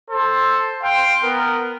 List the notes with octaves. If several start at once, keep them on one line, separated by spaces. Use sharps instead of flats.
A4 C5
F5 G5 C6
B3 A#4